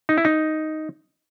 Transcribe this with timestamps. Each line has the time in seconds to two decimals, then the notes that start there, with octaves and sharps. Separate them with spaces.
0.09 D#4
0.18 E4
0.25 D#4